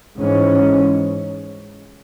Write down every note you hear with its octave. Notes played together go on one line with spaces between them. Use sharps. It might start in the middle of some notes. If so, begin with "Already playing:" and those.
G#2 E3 C#4